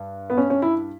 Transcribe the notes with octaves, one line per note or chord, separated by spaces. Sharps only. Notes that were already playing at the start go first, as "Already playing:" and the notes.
Already playing: G2
B3
C#4
C#4
E4